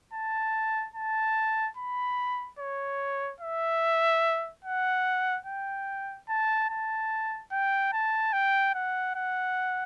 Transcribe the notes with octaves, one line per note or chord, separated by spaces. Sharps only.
A5
A5
B5
C#5
E5
F#5
G5
A5
A5
G5
A5
G5
F#5
F#5